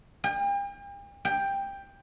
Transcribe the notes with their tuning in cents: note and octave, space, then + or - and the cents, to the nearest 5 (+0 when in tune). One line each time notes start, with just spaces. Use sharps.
G5 +40
G5 +10